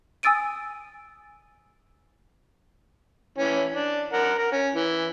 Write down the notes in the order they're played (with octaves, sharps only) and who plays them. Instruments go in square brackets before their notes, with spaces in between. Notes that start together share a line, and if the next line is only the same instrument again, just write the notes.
[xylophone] G#5 D#6 E6 A6 D7 D#7
[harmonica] E3 C#4
D4
A#4 F#5
A#4
C#4
E3